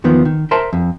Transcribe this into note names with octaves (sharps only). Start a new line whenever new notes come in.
E2 D#3 F3 B3
D#3
A#4 C5 E5 A5 A#5 C6
F2